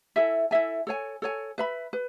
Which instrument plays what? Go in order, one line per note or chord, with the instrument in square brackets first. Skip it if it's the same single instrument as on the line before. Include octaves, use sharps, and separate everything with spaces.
[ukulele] E4 A4 E5 G#5
E4 A4 E5 G#5
A4 C#5 G#5
A4 C#5 G#5
B4 E5 B5
B4